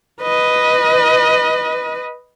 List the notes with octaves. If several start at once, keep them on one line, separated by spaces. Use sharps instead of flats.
B4 D#5